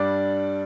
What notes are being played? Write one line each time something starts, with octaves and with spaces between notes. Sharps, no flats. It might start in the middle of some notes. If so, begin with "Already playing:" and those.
Already playing: G2 G3 D4 D5